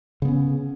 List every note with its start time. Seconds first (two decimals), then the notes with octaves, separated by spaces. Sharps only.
0.22 C#3
0.25 B3
0.28 C#4